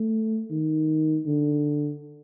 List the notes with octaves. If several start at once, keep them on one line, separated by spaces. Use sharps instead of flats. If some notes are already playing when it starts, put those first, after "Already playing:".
Already playing: A3
D#3
D3